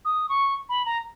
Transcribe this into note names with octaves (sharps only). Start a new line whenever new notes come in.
D#6
C#6
B5
A#5